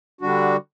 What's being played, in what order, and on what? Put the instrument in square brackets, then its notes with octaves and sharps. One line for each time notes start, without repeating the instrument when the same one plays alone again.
[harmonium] D3 G3 D4 F#4